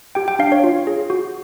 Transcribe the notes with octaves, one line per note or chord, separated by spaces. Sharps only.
G4 G5
G5
D4 F5
C#5
F4
G#4
F#4